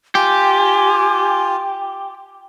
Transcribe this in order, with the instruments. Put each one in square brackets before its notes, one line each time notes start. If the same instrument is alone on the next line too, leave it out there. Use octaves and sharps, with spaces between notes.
[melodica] F4 [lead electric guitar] G4 [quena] G#5